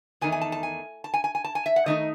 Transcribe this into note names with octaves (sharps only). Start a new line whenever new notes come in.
E2 D#3 A3 D#4 G#5
G#5
A5
A5
G#5
A5
G#5
G#5
G#5
A5
G#5
E5
F#5
D#3 A3 D#4 D#5